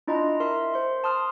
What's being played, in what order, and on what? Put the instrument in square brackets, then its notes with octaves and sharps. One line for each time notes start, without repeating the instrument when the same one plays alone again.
[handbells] D4 E4 F4 D#5 A#5 C6
A#4 E5 C6
C5 C6
A5 C6 D#6 F6